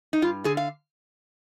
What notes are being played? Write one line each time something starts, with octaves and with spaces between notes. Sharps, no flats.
D#4
G2 F4
D3 G#4
F5